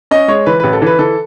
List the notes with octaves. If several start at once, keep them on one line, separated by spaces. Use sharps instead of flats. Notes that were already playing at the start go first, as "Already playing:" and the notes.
C#4 D#5
G#3 C#5
E3 B4
A1 B4
A4
E3 B4
E3 A4